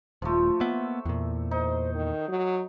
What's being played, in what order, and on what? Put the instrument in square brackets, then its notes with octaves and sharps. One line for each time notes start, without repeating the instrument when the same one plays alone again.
[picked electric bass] D#1 [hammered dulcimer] F3 A3
[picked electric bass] A#3 B3 [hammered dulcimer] E5
[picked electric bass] E2 A#2
[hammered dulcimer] D#4 [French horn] C5
[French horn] D#3
F#3